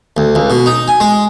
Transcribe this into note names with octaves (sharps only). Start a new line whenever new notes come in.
D2
C#2
B2
D#4
G#5
G#3